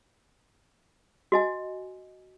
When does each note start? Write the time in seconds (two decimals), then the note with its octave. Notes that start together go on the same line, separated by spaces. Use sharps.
1.32 F#4 D#5 G#5